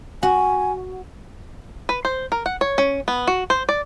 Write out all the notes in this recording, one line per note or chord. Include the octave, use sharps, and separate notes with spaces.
F#4 G#5
B4
C5
A#4
F#5
C#5
C#4
B3
F#4
C5
D5